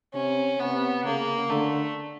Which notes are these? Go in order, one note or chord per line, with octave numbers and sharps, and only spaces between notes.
C3 C#4
C3 B3
C#3 A#3
D3 A3